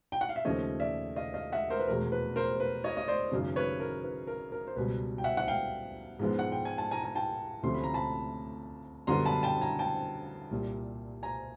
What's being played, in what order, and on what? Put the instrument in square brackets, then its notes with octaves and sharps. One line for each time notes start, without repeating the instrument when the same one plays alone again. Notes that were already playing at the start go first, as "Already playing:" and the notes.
[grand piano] G5
F#5
F5
E5
D#2 C#3 F3 A3 C#4 C#5 D#5
D5 E5
D#5 F5
D#5 F5
E5 F#5
A#4 C5
B4
F1 E2 B2 G#3 A#4
B4
A#4 C5
B4
C#5 D#5
D#5
C5 D5
G#1 F#2 C#3
B4 C#5
A#4
B4
A#4
A#4
C5
C#2 B2 G3 B4
G5
E5 F#5
F#5
F5 G5
G#2 F3 G#3 B3
F#5
G5
G#5
A5
G#5 A#5
G#5
G5 A5
D2 C3 F3 A3 C#4 C6
B5
A#5
A5 B5
F#2 D3 G3 B3 A#5 C6
A5 B5
G5 A5
G#5 A#5
G5 A5
C2 A#2 G3
G#5 A#5